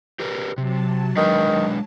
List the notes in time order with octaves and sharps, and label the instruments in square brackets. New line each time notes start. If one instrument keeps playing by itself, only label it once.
[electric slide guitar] G4 A#4 B4
[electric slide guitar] C3 [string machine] F#3 A5
[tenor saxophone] D#3 [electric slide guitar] G#3 D4 B4